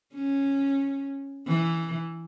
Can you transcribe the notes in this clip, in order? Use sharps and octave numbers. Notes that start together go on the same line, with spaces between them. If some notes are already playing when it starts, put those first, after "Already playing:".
C#4
E3